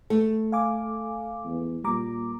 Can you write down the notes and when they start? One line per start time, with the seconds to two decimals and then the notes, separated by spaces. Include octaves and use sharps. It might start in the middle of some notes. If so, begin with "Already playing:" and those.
0.10 A3
0.52 F5 G#5 D6
1.45 E2
1.84 A#2 G3 A#5 D6